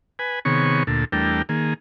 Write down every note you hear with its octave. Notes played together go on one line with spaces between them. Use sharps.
B4 G#5
C3 D#3 B3 G#4 C#5 C#6
D2 A#2 A4
E2 G3 A3 D4 A#4 G5
D#3 A#3 G#4